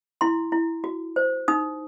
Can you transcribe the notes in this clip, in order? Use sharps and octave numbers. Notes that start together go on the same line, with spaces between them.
E4 C6
E4
F#4
C5
D#4 D#6